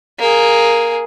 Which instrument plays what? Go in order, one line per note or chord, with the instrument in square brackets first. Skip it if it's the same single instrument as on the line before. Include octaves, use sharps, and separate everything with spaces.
[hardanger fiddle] A#3 G#4